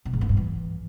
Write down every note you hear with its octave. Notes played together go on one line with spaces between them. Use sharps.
B2
G#2
A#3
G2
E3